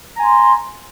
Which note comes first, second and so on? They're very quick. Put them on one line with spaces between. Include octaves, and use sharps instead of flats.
A#5 G#5 C6